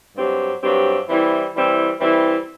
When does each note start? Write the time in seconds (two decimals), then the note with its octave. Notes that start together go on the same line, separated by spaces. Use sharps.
0.15 G2 F#3 C4 G4
0.61 G2 F#3 C4 G4
1.07 E3 G3 C4 E4
1.53 E3 G3 C4 E4
2.00 E3 G3 C4 E4